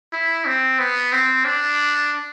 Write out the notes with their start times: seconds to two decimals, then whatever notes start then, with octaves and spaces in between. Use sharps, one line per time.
0.13 E4
0.45 C4
0.79 B3
1.12 C4
1.45 D4